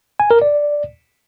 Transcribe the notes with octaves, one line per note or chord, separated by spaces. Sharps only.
G#5
A#4
D5